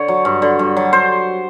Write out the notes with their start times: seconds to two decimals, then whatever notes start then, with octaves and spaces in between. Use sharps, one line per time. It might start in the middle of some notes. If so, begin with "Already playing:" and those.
Already playing: D3 C#5
0.08 F#3
0.25 G2
0.42 D3
0.59 G2
0.77 F#3
0.93 C5